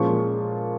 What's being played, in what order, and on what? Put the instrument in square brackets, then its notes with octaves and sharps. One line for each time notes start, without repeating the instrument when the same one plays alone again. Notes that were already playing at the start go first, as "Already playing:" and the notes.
Already playing: [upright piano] A#2 F3 G#3 C#4 F4 C#6